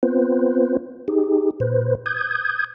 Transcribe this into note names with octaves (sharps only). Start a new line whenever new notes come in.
B3 C4 F4 B4 C5
D#4 G4 G#4
A#2 B4 C5
D#6 G6 G#6